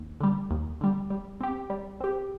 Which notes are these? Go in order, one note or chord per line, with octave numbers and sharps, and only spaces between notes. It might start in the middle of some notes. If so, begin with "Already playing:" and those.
Already playing: D#2
D3 G3
D#2
D3 G3
G3
C4 G4
G3
C4 G4